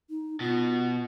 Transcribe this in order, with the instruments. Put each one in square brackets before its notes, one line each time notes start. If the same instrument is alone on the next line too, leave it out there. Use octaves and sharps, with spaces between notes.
[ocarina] D#4
[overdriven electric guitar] B2 [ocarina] F4